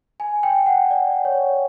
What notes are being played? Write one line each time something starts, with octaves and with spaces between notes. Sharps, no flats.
G#5
G5
F#5
D5
C#5